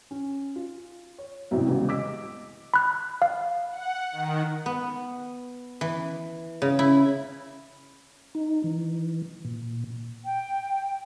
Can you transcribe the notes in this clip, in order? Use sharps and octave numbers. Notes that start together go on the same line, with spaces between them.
C#4
F4
C#5
C2 F#2 A2 C3 E3
E1 A1 E2 C#3 G3
D#5 D6 E6 B6
B5 F#6
F5
F#5
D#3
B3
E3
C#3
E4
D#4
E3
A#2
G5